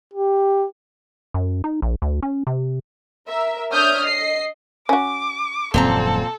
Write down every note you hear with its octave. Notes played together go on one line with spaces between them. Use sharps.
G4
F#2
D#4
A#1
D2
C#4
C3
A#4 E5
D4 C#5 E5 D#6 F6 G6
D#5 C7
C#4 F#4 D6
D#1 F#2 A#2 F3 C4 A4 A#5